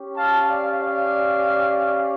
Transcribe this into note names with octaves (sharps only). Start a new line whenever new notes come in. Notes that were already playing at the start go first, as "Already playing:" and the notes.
Already playing: C#4 G4
F5 A5
D5 F5
D5 F5